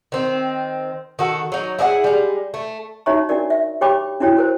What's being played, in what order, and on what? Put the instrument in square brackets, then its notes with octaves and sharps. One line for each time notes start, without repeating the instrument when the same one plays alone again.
[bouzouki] D#3 C4
D#3 F#4 A4
F#3 D#4
E4 G#4 D5 F#5
G3 G#3
A3
[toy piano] D#4 F#4 C#5 E5 A#5 C#6
D4 F#4 A#4 D5
E5
G4 C#5 G5 B5 D6
D4 E4 F#4 C#5 G5
F#4 A#4 C5